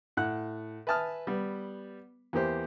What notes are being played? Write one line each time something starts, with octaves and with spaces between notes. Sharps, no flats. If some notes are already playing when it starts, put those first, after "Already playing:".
A2 F#5 F#6
B4 E5 G#5 A5 D#6 F6
G3 B3
E2 A#3 G4 C5